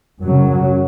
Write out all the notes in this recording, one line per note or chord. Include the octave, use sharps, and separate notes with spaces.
F#2 C#3 F#3